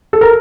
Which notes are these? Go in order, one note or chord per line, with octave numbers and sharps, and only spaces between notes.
A4
A#4